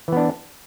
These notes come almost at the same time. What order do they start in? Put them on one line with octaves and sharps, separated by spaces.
E3 B3 D4